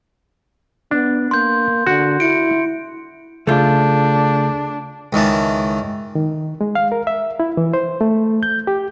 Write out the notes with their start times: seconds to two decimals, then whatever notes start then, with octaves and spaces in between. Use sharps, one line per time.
0.91 B3 D4
1.31 A#3 C6 G6
1.87 D3 F#4
2.20 E4 C#7 D7
3.47 C#3 A3 D4 F4 G#4 G6
5.13 C#2 D#3 E3 A5
6.15 D#3
6.61 G#3
6.75 F5
6.92 A#4
7.07 E5
7.40 E4
7.57 E3
7.74 C5
8.01 A3
8.43 G6
8.67 G4